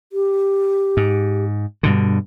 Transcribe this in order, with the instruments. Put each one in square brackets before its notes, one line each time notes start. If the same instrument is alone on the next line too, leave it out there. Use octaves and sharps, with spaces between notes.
[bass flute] G4
[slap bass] G#2
G2 B2 D3